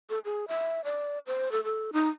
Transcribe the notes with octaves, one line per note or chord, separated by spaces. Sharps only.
A4
G#4
E5
D5
C5
A4
A4
D#4